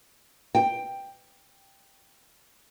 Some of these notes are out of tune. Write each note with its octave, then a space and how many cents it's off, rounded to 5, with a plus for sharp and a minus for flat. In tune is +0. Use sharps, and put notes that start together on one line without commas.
G5 +5